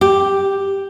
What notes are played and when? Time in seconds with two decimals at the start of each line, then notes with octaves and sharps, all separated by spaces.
0.01 G4